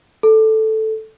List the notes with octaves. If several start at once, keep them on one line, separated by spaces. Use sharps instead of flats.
A4